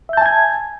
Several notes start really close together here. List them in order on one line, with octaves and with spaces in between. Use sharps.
E5 G6 A5 G#5 G#6